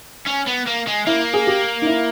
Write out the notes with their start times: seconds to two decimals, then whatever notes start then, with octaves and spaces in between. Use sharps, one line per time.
0.26 C#4
0.47 B3
0.67 A#3
0.87 G#3
1.06 A#3 E4
1.34 G#4
1.47 G4
1.82 D#4
1.87 E4